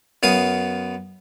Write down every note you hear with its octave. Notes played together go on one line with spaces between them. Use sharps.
F#2 B3 F5 D#6